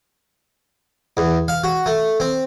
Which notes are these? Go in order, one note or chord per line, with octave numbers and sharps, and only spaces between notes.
E2
F5
F#4
A3
C4